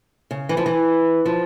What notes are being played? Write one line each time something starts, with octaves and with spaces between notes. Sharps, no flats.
C#3
E3
F3
E3
F3